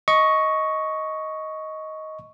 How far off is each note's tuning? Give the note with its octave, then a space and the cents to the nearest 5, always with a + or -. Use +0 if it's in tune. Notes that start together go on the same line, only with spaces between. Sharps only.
D#5 +10 C#6 +0